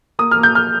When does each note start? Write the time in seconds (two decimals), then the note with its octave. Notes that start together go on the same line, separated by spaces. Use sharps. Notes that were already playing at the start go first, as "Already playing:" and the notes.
0.19 A#3 D#6
0.31 F6
0.37 A#3
0.43 G6
0.55 F6